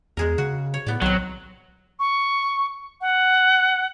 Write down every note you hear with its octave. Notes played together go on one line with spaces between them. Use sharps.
E2 G#3 G#4 A#4
C#3 F#4
C#5
A2 B3 D5
B1 D#3 F#3 C4
C#6
F#5